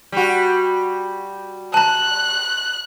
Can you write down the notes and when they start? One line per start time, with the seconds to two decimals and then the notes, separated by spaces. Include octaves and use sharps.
0.12 G3 F#4
1.74 A5 A#5 F#6